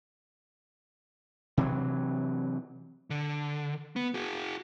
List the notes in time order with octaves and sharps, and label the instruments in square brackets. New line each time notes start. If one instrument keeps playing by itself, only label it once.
[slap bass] C3 E3 F#3
[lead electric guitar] D3
B3
F#4 G#4